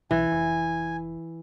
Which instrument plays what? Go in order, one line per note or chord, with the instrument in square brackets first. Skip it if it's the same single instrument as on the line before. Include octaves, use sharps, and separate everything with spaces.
[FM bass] B1 [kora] E3 [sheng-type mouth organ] G#5
[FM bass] F1